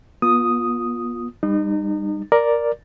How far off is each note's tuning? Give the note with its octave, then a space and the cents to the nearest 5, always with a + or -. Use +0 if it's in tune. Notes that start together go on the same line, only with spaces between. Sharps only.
B3 -40 F4 +15 D#6 +0
G3 +20 D#4 -30
A#4 +5 D5 +0